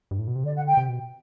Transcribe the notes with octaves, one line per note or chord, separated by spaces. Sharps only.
G2
A2
B2
C3
D3 D5
F#5
G5
C3
B2